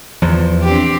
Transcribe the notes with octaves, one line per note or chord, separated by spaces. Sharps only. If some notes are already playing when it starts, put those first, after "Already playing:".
E2 F3
C4 D4 G4